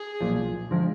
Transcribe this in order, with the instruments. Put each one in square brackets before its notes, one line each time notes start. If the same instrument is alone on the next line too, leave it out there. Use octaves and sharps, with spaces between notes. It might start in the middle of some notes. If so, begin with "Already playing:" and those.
Already playing: [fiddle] G#4
[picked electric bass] B1 A#2 F3
D3 F3 G#3